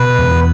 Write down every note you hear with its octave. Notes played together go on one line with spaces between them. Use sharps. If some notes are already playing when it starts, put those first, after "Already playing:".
Already playing: B2 B4
E2